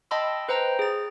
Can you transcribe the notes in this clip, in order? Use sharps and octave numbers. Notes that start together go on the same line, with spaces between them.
D#5 G5 A5 B5 C6 E6
B4 C5 G5 A#5
G#4 A6